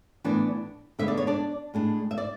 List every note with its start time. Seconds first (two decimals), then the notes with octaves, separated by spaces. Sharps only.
0.24 A2 E3 B3 D4 D5
0.99 D3 G#3 B3 E5
1.08 D5
1.17 C#5
1.27 D4 D5
1.74 A2 G#3 D4
2.11 E5
2.18 D5